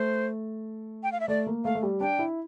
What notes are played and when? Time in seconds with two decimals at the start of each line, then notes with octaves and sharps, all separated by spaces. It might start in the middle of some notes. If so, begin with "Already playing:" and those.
Already playing: A3 C5
1.03 G5
1.12 F5
1.20 E5
1.28 A3 D5
1.47 A#3
1.65 A3 F5
1.75 A3
1.83 G3
2.00 D4 G5
2.19 E4